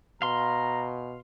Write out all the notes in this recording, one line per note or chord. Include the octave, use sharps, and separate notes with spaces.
B2 F5 A#5 C6